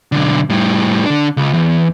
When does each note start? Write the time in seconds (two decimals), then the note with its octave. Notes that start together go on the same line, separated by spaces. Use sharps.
0.12 B1 D3
0.50 A2 G3
1.06 D3 D4
1.37 C#2
1.53 E2